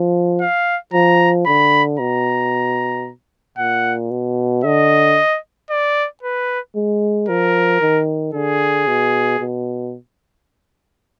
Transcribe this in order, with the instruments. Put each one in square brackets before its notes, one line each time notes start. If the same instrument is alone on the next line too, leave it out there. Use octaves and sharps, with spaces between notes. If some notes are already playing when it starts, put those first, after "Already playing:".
Already playing: [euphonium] F3
[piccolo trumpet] F5
[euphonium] F3 [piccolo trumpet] A#5
[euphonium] D3 [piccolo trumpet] B5
[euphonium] B2 [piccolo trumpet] A#5
[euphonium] A#2 [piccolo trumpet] F#5
[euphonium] B2
[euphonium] D3 [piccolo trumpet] D#5
[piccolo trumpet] D5
B4
[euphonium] G#3
[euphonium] F3 [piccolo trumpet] A#4
[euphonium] D#3
[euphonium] D3 [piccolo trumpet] G#4
[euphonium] B2
B2